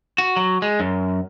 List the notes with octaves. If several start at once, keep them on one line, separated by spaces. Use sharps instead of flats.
F#4
F#3
G#3
F#2